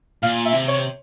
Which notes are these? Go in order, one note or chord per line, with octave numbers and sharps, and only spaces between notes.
A#2 F5
E5
C3
C#5